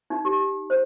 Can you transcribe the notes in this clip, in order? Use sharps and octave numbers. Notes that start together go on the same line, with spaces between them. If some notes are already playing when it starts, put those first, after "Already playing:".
D#4
G4
C5